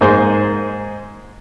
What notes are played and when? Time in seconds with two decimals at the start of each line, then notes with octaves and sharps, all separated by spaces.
0.01 G#2 A#3 G#4 C5